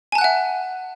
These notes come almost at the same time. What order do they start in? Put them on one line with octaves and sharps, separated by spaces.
G#5 A5 F#6 F#5 E5